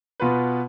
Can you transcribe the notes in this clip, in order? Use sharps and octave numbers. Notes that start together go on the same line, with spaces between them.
B2 B3 F4 B4